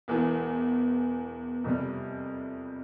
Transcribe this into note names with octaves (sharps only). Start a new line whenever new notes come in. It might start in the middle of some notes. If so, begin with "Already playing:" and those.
E1 E2 E3
F2 C3 G3